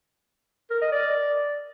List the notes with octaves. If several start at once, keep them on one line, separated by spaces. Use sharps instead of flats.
A#4
D#5
D5